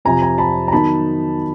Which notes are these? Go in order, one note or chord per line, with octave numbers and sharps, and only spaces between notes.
F2 C3 F3 G#5 A#5
G#5 A#5
A5 B5
A#5
D#3 F#3 B3 D#4 A5 B5